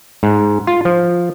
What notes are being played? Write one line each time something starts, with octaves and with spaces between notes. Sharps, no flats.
G#2
F4
F3